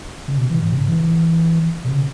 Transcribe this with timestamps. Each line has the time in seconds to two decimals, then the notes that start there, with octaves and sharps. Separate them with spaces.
0.28 C#3
0.38 B2
0.50 E3
0.62 G#2
0.71 B2
0.75 C#3
0.88 E3
1.85 B2
1.89 C#3